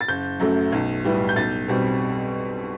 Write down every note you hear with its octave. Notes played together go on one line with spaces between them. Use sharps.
A6
F#1 G6
F#2 F#3 A3
B1
A2 G3 B3 E4
G6
B1 A6
B2 G3 C4